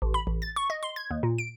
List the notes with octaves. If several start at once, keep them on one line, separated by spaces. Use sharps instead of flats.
A1
B5
A1
A6
C#6
D#5
C6
G#6
D#2
A#2
D7